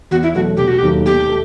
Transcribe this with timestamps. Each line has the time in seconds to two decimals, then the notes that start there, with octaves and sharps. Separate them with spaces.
0.11 E2 F#4
0.23 E4
0.35 B2 F#3 A3 F#4
0.57 E1 G4
0.68 F#4
0.78 G4
0.82 D#2 D#3 F#3 A3
1.06 B2 G4
1.29 A3